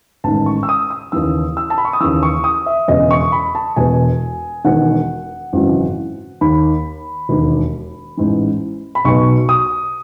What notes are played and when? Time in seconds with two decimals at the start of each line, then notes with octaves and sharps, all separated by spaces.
0.24 A1 G#2 D#3 A5
0.46 C#6
0.63 E6
0.69 D#6
0.90 D#6
1.12 D#2 C#3 E3 E6
1.57 E6
1.70 A5
1.78 B5
1.85 C#6
1.93 D#6
2.00 D#2 C#3 E3 E6
2.23 C#6
2.44 D#6
2.66 E5
2.88 E1 E2 C#3 D#5
3.11 C#6
3.32 B5
3.55 A5
3.76 E1 E2 B2 G#5
4.64 E1 E2 D#3 F#5
5.53 G#1 F#2 C#3 E3
6.41 D#2 D#3 B5
7.29 E1 D#2 D#3
8.17 A1 G#2 E3
8.95 B5
9.05 B1 B2 C#6
9.49 D#6